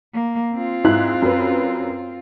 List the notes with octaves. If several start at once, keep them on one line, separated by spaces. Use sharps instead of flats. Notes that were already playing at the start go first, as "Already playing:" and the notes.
A#3
C4 F4
G#2 E4 F#6
F#2 B4